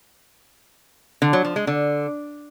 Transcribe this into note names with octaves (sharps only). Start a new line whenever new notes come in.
D3
F#3
F3
G#3
D3